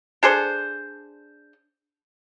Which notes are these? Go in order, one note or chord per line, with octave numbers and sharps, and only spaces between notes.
D4 G#4 A4 C5